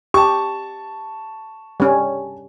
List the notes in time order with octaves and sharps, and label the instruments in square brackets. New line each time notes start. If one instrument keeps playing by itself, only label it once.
[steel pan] G4 [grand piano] A5 C#6
[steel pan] G3 C#4